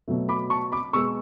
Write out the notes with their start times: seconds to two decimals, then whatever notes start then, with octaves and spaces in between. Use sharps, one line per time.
0.08 B2 F#3 A3
0.29 B5 D6
0.50 A5 C#6
0.72 B5 D6
0.93 B2 G#3 B3 C#6 E6